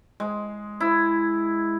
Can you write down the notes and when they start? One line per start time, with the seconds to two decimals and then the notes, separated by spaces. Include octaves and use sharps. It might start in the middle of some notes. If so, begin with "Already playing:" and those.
0.20 G#3
0.80 E4